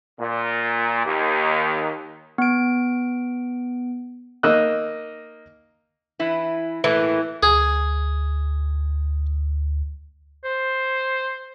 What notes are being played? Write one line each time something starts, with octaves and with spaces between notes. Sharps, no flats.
A#2
D#2
B3 D7
A#3 D#4 D#5 E6 F#6
E3 E4 B4
A2 E3 A3 A#3
D2 G#4
C5